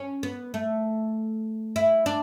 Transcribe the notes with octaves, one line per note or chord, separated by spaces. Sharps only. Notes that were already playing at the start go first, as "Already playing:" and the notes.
Already playing: C#4
B3
A3
E4
D4